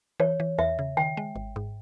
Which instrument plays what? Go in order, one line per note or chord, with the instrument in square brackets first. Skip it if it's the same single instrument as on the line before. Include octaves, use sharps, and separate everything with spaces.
[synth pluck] E3 [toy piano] C#5
[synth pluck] E3
[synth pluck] E2 [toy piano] E5
[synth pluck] C#3
[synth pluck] D#3 [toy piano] G5
[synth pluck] G#3
G#1
G#2